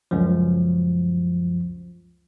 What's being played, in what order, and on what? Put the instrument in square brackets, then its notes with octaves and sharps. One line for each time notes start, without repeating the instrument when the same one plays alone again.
[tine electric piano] C#2 F#2 F3